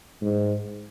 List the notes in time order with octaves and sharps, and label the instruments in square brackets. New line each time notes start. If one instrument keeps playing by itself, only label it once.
[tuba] G#2